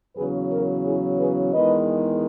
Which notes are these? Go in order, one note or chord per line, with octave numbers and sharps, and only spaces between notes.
E2 C#3 F#3 G#4 B4
F#4 A#4
E4 G#4
G#4 B4
E2 D#3 G#3 B4 D#5